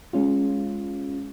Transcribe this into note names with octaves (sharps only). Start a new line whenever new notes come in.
G#3 C#4 F4